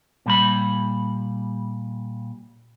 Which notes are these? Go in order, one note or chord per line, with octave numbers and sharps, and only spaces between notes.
A#2 G3 B5